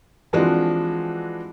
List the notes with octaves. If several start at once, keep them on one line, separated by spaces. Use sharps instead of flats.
E3 F3 G#3 C4 D4 F#4